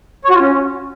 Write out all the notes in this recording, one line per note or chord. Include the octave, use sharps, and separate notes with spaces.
C#5
F#4
F4
C#4